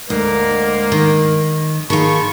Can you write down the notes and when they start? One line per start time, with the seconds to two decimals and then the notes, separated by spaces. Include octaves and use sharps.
0.10 D2 G#3 A#3 A#4
0.92 D#3
1.90 D#3 F4 G#4 A5 B5 C#6